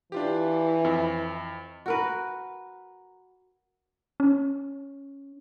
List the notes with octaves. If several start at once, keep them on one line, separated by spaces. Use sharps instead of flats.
E3 D4 F4 G4
F2
F#4 A#4 B4
C#4